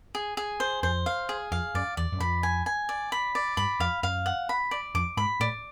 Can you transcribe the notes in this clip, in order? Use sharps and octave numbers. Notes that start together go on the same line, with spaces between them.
G#4
G#4
C5
F2 C5
F5
G#4
F2 F5
F#2 D5
E2 D5
F#2
F2 B5
G#5
G#5
D5
B5
D5
G2 B5
F2 F5
F#2 F5
F#5
B5
D5
F2 D6
G#2 B5
A2 D5